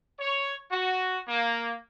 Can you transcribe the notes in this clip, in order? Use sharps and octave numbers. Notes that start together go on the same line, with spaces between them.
C#5
F#4
A#3